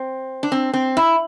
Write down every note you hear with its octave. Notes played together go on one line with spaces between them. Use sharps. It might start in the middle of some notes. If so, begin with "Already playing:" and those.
Already playing: C4
D4
C4
C4
E4